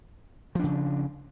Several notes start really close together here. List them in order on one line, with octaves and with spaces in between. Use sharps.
F3 D4 C#3